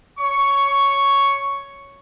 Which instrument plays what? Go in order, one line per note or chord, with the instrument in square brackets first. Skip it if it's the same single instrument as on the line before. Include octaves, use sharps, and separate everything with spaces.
[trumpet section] C#5 C#6